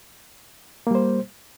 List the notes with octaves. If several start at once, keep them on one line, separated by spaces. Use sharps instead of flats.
G3 A#3 C5